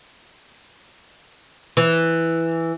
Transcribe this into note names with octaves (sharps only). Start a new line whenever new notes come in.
E3